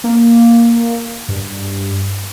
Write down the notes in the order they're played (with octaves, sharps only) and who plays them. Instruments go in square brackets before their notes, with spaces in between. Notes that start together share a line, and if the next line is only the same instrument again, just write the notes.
[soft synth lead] A#3
G2